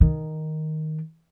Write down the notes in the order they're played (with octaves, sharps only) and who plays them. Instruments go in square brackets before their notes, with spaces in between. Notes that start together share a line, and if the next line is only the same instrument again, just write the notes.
[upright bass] D#3